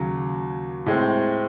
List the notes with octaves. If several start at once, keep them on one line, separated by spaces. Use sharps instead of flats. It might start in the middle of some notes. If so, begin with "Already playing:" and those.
Already playing: D#2 C#3 F#3
A2 G#3 C4